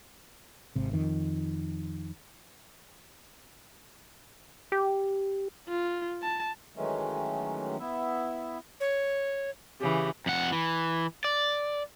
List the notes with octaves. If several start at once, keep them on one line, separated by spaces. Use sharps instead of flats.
G#1 C3
F2 D#3
G4
F4
A5
D#3 E3 F#3 G#3 A3 C#4
B3 E4 E5
C#5
C#3 E3 G4
F2 F#5
E3
D5